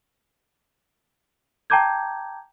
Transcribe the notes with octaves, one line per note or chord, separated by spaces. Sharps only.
G5 A5 A#5 D6 G6 G#6